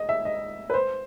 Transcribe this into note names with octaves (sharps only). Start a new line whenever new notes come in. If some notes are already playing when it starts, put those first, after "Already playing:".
Already playing: D#5
E5
D#5
B4
C5